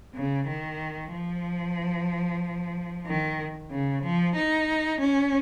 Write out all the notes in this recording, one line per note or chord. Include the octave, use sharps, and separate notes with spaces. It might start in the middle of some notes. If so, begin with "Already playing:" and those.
C#3
D#3
F3
D#3
C#3
F3
D#4
C#4